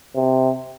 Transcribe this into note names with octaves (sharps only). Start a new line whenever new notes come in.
C3